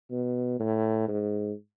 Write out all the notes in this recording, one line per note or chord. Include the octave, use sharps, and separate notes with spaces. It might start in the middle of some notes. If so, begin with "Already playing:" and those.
B2
A2
G#2